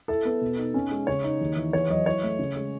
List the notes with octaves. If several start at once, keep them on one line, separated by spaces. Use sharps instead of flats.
E4 A4
B3
B2
D#4
C#4
G#3
C#3 C#5
D#4
D#2
E3
E2 C#5
F#3 D#5
E4 C#5
A3
C#3
G#3